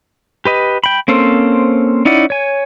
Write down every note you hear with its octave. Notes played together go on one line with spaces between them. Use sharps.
G4 B4 D#5
G5 B5
A#3 C4 C#4 A4 C5
C#4 D#4 E4 D5 F#5
C#5 G#5